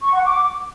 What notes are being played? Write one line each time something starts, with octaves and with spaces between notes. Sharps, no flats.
C#6
F#5
D6